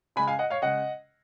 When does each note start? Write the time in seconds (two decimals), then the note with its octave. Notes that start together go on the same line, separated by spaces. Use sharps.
0.16 C#3 G#3 G#5 B5
0.27 F5 G#5
0.39 D#5 F#5
0.50 C#5 F5
0.62 C#3 G#3 D#5 F#5